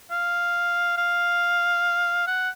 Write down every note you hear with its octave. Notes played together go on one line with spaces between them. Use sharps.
F5
F5
F#5